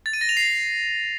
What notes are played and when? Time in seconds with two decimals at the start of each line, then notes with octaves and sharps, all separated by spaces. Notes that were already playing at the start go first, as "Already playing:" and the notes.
0.06 A6
0.13 D#7
0.21 A#6
0.29 F7
0.37 C7